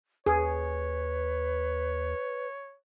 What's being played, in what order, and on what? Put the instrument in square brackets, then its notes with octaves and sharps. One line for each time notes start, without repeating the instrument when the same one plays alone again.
[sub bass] D#2 [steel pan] G#4 [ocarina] B4 [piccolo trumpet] C#5